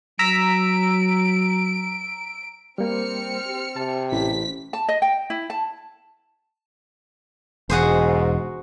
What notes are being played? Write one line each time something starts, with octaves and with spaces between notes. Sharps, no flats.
F#3 A#5 E6 B6 D7
G3 A#3 C4 F6 C#7
G4
C3 A5
A1 A2 B6
A5
D#5
G5
E4
A5
E1 G#2 F#4 G#4 C5